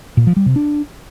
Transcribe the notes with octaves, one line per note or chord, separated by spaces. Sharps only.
A#2
F3
G3
C3
D4